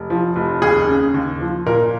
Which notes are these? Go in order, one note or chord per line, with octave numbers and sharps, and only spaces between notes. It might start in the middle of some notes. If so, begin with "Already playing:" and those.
Already playing: F1
F3
F1
D#2 G#4
C#3
D#2
F3
A#2 A#4